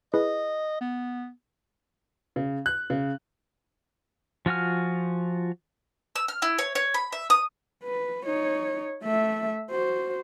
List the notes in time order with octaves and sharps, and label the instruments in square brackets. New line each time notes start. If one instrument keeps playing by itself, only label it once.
[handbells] E4 G#4 B4 [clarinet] D#5
[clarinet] B3
[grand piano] C#3
F#6
C#3
[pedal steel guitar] F3 F4 F#4 G#5 F6
[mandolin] E6
F6
E4
C#5
C#5
B5
E5
D#6
[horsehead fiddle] B4
D#4 C#5
A3 E5
F#4 C5